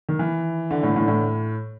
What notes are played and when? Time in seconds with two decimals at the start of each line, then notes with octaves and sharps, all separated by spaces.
0.09 D#3
0.19 E3
0.71 D3
0.83 A2
0.96 A2
1.08 A2